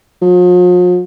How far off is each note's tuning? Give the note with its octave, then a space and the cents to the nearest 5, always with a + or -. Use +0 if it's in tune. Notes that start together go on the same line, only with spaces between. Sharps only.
F3 +45